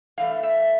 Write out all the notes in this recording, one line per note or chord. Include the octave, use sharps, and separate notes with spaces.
G2 E3 A3 F5
E5